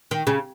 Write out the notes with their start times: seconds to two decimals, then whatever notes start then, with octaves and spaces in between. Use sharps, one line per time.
0.11 D#3
0.27 C#3